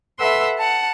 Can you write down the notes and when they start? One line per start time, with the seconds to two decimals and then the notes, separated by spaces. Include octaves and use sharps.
0.19 A4 B4 E5 F#5 C6 E6
0.58 F#5 A5